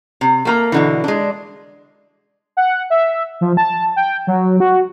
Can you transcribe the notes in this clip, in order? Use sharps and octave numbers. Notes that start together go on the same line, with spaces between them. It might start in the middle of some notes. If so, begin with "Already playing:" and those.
C3
A3 A#3 A#5
B2 D3 E3
G#3 D4
F#5
E5
F3
A5
G5
F#3
F#4